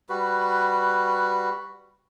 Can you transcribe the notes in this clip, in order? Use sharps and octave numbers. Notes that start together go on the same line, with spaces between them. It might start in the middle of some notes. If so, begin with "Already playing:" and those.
G3 F#4 B4